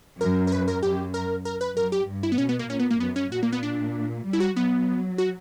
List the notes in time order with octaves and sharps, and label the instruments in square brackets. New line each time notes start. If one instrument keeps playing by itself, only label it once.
[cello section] F#2 [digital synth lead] A#4
[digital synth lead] A#4
B4
A#4
[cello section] F#2 [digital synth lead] G4
[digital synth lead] A#4
A#4
B4
[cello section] F#2 [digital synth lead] A#4
[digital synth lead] G4
[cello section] G2
[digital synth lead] E4
B3
[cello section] B2 [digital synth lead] C#4
[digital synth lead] B3
A#3
[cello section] A#2 [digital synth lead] C#4
[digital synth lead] B3
A#3
[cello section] F#2 [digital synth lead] B3
[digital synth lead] C#4
[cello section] A#2 [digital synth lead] F#4
[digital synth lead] A#3
B3
D4
[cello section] G3
[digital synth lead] E4
F#4
[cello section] F#3 [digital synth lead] B3
[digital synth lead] F#4